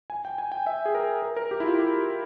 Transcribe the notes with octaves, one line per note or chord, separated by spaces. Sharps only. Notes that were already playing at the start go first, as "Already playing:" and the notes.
G#5
G5
G#5
G5
E5
G#4
A#4
A#4
A#4
G4
E4
F4
G4